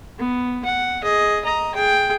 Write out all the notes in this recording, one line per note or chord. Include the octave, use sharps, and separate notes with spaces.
B3
F#5
G#4 D#5
D#5 A#5
G#4 G5